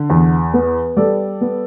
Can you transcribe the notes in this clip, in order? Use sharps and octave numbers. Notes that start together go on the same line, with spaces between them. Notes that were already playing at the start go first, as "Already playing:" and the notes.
Already playing: D3
E2
B3
G3 A4 D5
B3